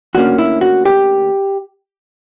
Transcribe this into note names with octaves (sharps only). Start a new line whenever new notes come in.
D2 D3 A#3 C#4 F#4
E4
F#4
G4